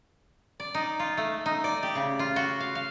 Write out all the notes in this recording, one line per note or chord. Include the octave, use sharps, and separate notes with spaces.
D5
D#4
F4
A3
D#4
D5
G4
C#3
F4
F#4
F5
F5